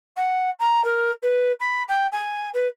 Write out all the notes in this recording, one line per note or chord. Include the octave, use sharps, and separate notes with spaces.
F#5
A#5
A#4
B4
B5
G5
G#5
B4